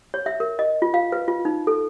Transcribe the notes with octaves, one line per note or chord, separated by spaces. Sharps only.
C#5
E5
A#4
D#5
F4
F5
B4
F4
D#4
A4